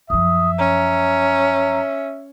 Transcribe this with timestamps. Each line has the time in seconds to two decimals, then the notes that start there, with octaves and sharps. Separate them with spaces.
0.10 F#2 F3 E5 D#6
0.59 C#4 A#5